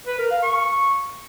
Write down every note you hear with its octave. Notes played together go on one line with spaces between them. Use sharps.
B4
A#4
F5
C#6